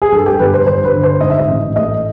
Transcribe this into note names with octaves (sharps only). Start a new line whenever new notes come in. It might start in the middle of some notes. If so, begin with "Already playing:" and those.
G#4
G2 A4
G4
G1 B4
C5
G1 C5
B4
D3
C5
G#2 D#5
E5
D#5
A1
A3 D#5